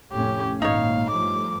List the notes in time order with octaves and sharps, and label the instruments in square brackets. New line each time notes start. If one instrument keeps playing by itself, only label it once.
[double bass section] F1 A2 C#4 [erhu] G4
[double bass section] G#1 A#2 A#3 [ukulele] D#4 C#5 [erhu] F5
[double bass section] G2 F3 A3 [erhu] D6